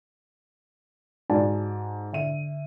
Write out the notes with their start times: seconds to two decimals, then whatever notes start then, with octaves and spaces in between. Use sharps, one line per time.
1.30 G#2 F#4 D5 G#5 A5
2.12 D3 E5 D#7